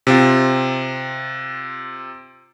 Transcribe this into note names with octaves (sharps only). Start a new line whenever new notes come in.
C3 C4 F4